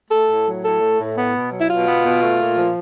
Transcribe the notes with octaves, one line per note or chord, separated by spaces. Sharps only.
A3 A4
A2
F#3
A2 A4
A3
A2
B3
B2
F#3
E4
B2 F4
B3
B2
A3
A#2
F3